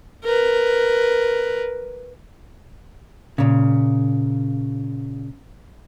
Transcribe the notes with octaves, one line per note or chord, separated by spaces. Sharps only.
A#4 B4
A#2 C#3